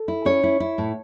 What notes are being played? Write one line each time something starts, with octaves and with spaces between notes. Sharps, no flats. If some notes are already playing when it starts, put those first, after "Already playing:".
Already playing: A4
E4
C#4 C#5
E4
E4
A2